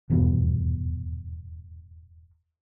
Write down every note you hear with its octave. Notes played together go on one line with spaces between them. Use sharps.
D#1 E2 G2 B2